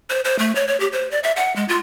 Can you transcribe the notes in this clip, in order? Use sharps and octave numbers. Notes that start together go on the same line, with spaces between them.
C5
C5
A3
C#5
C#5
G4
C5
D5
E5
F#5
G#3
F4